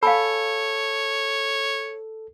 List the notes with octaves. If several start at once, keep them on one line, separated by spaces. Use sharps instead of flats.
A4 C#5 F5 G#5 B5